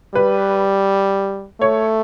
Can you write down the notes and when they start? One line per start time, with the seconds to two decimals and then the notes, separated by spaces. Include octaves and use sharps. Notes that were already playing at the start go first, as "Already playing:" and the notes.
0.15 G3 B4
1.61 A3 C#5